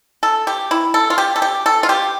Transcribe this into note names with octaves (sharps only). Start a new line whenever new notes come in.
A4
G4
E4
A4
F4
G4
A4
G4
A4
F4
G4